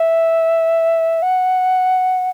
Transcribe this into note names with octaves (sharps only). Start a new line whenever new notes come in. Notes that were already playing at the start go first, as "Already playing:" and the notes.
Already playing: E5
F#5